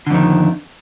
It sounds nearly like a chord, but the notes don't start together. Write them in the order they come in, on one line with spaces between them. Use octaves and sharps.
D3 F2 D#3